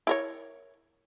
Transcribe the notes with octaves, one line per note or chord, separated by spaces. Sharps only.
E4 A#4 C#5